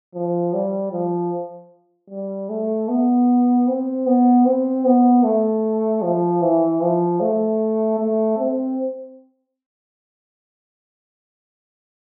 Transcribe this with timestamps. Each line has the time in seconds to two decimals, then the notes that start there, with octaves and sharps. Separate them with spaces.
0.14 F3
0.54 G3
0.92 F3
2.10 G3
2.50 A3
2.89 B3
3.68 C4
4.06 B3
4.45 C4
4.85 B3
5.24 A3
6.02 F3
6.42 E3
6.81 F3
7.21 A3
7.99 A3
8.38 C4